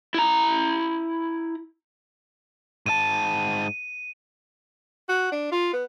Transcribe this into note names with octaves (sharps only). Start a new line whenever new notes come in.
E4 A#5
G#2 A5 D#7
F#4
D4
F4
B3